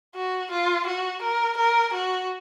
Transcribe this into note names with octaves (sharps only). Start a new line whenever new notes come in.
F#4
F4
F#4
A#4
A#4
F#4